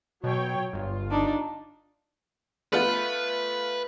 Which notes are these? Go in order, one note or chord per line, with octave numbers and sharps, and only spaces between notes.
B2 F#3 C#5 G5
G1 F4
D4 D#4
A3 B3 F4 B4